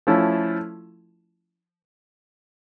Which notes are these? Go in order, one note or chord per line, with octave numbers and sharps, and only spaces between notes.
F3 A3 C#4 E4